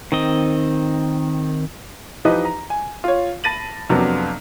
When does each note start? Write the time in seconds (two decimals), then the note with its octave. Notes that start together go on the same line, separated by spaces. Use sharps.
0.12 D#3 C4 D#5
2.25 E3 F3 D#4 G4 B4 D#5
2.45 A#5
2.70 G#5
3.04 F4 C#5
3.44 A5 B5 A6 A#6 D#7 F#7
3.89 F2 C3 F#3 A#3 B3 D4